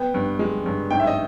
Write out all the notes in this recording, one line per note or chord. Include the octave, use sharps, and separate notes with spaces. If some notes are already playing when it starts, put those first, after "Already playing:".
Already playing: B3 G5
G2
G#3
G2
G#2 G5
E5
D#5